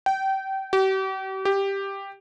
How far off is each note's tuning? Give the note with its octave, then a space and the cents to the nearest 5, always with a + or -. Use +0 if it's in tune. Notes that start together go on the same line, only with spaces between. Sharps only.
G5 -25
G4 -40
G4 +5